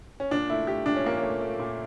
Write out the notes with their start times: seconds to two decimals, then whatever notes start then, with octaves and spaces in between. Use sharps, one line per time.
0.20 C#4
0.31 A#2 D4
0.50 A3 E4
0.67 A3 G4
0.86 A#2 D4
0.96 C#4
1.05 A#2 A#3
1.17 C#4
1.23 A3
1.41 A3
1.60 A#2